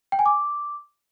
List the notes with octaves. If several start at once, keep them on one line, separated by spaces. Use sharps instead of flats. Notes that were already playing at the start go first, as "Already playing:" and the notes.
G5
G#5
D6